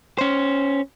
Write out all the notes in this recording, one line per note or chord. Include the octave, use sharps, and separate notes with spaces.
C#4 C5